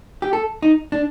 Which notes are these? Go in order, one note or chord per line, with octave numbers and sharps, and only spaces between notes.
G4
A4
D#4
D4